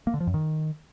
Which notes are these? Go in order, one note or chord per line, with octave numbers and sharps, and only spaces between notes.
A#3
D3
F3
F#2
D#3